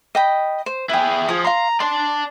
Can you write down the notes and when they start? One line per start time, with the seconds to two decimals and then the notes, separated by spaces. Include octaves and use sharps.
0.15 D#5 G5 B5
0.66 C5
0.89 E4 G#4 B4 G5
1.29 F3 G#4 D#6
1.45 F5 A#5 C6
1.80 D5 A5 C6